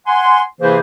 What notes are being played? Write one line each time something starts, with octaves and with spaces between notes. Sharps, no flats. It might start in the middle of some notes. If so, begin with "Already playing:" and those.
F#5 G#5 C6
C3 E3 A#3 E4 G#4 C5